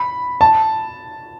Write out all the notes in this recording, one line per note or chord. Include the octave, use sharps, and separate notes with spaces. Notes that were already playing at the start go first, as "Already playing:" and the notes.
Already playing: B5
A5